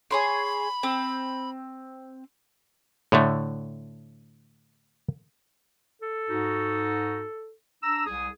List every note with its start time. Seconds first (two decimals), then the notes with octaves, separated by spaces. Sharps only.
0.11 G#4 C#5 B5 C6
0.83 C4
3.12 A2 D3 A3
6.02 A4
6.28 G#2 D#4 F#4
7.83 D4 A#5 E6
8.06 C2 G#4 D#6